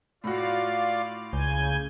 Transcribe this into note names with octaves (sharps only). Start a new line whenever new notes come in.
A2 F4 F#4 D5 F5
C#2 C#3 G#5 G6